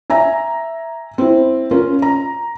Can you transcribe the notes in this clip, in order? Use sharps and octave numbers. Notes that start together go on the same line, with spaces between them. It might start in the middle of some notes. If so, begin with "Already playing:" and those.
E5 G#5 A#5
C4 E4
C#4 F4 A#4
A#5